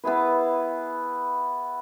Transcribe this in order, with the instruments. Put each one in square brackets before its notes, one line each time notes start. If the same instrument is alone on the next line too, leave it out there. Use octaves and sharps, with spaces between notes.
[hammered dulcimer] B3 E4 G#4 B4